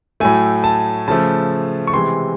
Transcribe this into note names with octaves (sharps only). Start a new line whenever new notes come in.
A2 F#3 A3 G#5
A5
C#3 F3 A3 A5
C#6
C3 E3 G#3 C6